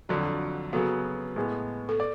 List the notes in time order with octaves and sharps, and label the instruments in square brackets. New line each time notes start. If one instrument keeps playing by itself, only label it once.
[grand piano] F2 D3 F#3 [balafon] D4 F#4
[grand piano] C#3 F#3 B3 [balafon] F#4 A4
[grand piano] A2 G#3 B3
[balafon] A4
[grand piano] D5